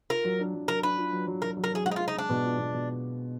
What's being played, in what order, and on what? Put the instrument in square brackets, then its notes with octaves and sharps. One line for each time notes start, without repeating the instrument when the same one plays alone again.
[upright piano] F4 [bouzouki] A#4
[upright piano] F#3
D4
F#3
[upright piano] F#3 [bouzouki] A#4
[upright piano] D4 [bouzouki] B4
[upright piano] F4
F#3
F#3
[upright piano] F#3 [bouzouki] A#4
[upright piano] F#3
[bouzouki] A#4
[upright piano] F#3 [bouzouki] G#4
[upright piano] G#3 [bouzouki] F#4
[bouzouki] D#4
F4
[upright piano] G#3
[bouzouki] D#4
[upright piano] G#3 [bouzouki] D4
[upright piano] B2
F4
B2
B2